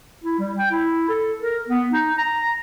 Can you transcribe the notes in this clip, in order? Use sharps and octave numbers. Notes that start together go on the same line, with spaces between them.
E4
G3
G5
E4
A4
A#4
B3
D#4
A#5